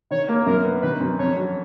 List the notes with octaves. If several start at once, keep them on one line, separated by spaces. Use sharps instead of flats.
D#3 C#5
A#3
F#2 A#4
B3
D#3 B4
F#2
F2 C#5
F#3